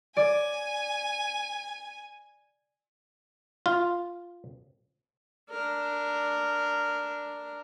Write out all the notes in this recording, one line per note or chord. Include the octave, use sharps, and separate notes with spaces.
D5 G#5
F4
D4 A#4